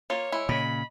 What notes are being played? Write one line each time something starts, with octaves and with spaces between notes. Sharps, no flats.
A#3 F4 C#5
G#3 E4
A#2 C#3 D#5 B5